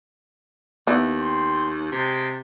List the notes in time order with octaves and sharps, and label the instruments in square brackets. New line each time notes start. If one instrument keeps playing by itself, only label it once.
[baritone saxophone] D#2 [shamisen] B3 E4
[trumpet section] G5 C6
[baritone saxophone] C3 [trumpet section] G#3 G5 A5